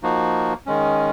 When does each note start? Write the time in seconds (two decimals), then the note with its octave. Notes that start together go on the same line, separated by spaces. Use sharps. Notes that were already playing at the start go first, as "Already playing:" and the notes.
0.03 F3 A#3 D#4 F#4
0.66 D#3 G#3 C#4